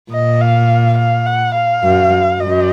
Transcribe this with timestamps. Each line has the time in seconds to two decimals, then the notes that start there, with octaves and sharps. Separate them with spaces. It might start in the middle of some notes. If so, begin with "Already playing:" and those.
0.12 A#2 D#5
0.41 F5
0.98 F5
1.26 F#5
1.54 F5
1.83 F#2
2.40 F#2 D#5